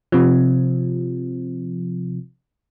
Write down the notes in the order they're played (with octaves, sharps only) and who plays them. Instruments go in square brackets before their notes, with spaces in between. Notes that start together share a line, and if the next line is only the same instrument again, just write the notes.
[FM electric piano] C3 F3